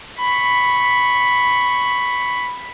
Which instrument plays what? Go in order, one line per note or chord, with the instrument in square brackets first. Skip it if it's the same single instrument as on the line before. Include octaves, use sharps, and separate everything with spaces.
[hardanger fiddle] B5 C#6